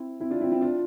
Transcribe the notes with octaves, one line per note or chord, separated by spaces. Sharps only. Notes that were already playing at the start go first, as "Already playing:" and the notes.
Already playing: C4 E4
C4 E4
D4 F4
C4 E4
C4 E4
D4 F4